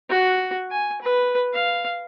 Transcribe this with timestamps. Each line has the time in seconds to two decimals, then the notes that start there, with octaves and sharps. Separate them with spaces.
0.10 F#4
0.71 G#5
1.02 B4
1.54 F5